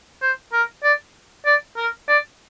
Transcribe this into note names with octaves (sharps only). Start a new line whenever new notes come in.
C5
A#4
D5
D5
A#4
D5